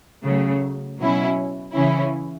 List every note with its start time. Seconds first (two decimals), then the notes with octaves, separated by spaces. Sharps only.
0.24 C#3 F#3 A3
0.99 B2 F#3 C#4 E4
1.73 C#3 E3 C#4 E4